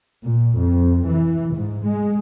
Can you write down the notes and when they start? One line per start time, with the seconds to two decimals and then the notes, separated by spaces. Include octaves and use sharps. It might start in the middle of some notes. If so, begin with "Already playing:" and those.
0.24 A#2
0.58 F2
1.08 E3
1.55 G#2
1.86 G#3